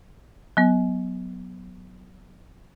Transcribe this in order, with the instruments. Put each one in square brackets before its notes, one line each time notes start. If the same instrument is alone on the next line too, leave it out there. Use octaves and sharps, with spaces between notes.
[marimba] F#3 B3